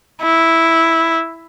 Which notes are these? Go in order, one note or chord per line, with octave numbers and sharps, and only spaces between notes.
E4